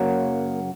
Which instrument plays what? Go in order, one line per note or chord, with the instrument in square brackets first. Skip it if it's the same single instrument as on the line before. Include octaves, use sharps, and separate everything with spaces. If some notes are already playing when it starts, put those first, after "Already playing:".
Already playing: [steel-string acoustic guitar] F#2 C#3 F#3 A#3